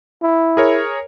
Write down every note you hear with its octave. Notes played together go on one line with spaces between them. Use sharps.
E4
G#4 A#4 C#5